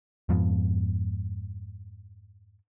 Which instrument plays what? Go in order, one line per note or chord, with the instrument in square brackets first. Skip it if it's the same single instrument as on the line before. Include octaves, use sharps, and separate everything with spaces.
[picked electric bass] F2 G#2 F3 B3